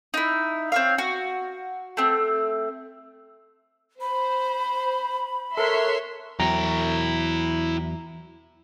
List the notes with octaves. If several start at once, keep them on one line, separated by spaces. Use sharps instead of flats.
D#4 E4
C4 C#5 F5
F#4
A3 C4
C5 B5
A4 A#4 C#5 E5 C6 F#6
E2 F#3 E4 G5 A#5